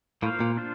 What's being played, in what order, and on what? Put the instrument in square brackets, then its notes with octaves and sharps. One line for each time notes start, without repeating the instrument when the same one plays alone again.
[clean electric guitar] A2 [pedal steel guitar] A#3 F4 C5 F5
[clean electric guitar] A#2
[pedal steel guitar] D4 F4 C5